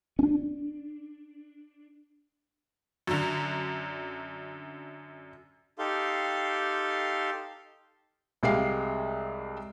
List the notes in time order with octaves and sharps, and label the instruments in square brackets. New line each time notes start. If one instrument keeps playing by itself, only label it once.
[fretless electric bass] C#4 D4
[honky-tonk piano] F#2 D3
[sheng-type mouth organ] D#4 G4 A4 F5 C6
[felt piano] C2 G#3 G4 F5 C7